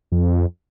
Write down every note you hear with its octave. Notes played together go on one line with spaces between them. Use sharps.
F2